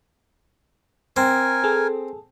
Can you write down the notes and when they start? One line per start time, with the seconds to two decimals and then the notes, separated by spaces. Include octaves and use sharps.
1.16 C4 A#4 G#5
1.64 G#4 A4